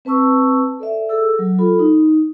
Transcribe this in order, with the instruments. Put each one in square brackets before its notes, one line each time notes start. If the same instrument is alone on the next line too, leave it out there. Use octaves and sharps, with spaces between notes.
[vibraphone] C4 B4 A5 C#6 E6
A4 D5 E5
G#4 A4 E6
F#3
F4 A4 B5
D#4